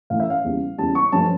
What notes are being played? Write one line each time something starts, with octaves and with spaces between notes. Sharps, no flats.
A2 E3 A3 F5
E5
F5
E2 C#3 G3
E2 C#3 G3 A5
C#6
G2 F3 A3 C#4 A5